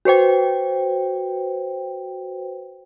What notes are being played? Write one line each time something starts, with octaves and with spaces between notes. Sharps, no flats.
F#4 B4 C5 G5